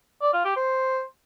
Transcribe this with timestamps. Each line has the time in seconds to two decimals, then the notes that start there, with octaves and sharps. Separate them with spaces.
0.22 D5
0.33 F4
0.45 G4
0.56 C5